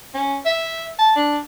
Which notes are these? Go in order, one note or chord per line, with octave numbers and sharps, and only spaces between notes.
C#4
E5
A5
D4